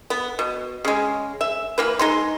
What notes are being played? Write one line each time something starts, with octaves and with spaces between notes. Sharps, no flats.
B3
B2
C#3 G#3
E5
E3 A#3 B4
G#3 D#4 C6